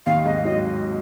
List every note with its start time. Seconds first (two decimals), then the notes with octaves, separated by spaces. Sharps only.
0.06 D#2 D#3 F5
0.26 G#2 G#3 D#5
0.45 F#3 D#5